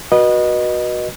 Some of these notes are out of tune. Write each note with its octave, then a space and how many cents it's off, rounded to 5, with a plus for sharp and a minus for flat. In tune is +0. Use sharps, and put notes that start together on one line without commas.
F#4 +0 B4 -30 D#5 -20